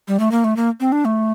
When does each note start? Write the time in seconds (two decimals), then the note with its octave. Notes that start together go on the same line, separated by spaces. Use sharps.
0.08 G3
0.19 A3
0.31 A#3
0.44 A3
0.56 A#3
0.80 C4
0.92 D4
1.05 A3